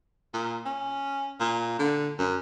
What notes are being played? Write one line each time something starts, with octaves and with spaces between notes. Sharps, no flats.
A#2
C#4
A#2
D3
F#2